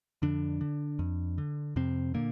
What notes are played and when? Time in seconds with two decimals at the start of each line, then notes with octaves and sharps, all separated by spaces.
0.22 F2 D3 D4
0.61 D3
0.99 F2
1.38 D3
1.76 F2 C3 C4
2.14 A#2 D3 A#3